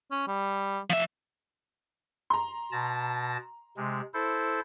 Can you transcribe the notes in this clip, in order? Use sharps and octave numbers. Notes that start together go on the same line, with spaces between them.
C#4
G3
F3 E5
A#5 C6
B2 A5 A#6
C3 G#3
E4 A4 C5